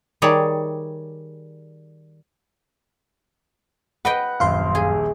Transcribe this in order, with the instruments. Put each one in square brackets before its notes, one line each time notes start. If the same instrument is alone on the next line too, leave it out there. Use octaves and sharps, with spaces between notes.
[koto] D#3 G3 G#4 C#5 D5
[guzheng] B4 D#5 G5 [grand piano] F#5
[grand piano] D#1 A#1 [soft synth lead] F#2 [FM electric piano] F5 C6
[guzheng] G#4